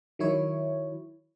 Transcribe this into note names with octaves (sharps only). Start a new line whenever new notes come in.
D#3 F#3 E4 C#5